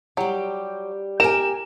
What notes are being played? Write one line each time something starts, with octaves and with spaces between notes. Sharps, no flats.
F#3 G3 G4
G4 A#4 G5 G#5 E7